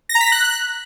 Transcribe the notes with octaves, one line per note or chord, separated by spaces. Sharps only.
A#6
A#5
B6
A#6
F#6